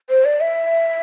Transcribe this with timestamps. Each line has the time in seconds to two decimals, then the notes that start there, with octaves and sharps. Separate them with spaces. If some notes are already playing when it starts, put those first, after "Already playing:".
0.10 C5
0.25 D5
0.41 E5